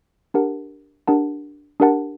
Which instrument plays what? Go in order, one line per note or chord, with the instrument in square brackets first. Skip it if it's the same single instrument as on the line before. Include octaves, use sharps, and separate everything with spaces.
[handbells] D4 G4 A#4 F#5 A5
D4 G4 A#4 F#5 A5
D4 G4 A#4 F#5 A5